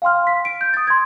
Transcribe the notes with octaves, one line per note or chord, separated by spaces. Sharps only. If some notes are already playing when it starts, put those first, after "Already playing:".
F5 G5 C6 F6
B6
D7
G6
D#6 A6
C6 G#6